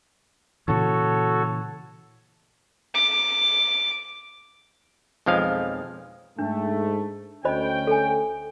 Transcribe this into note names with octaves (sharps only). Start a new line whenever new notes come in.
A#2 C#3 E3 F#4 A4 C#5
D6
B1 F2 F3 G#3 F5
G#2 A3 D4
D2 C#4 C5 D#5 G5 B5
A4 G#5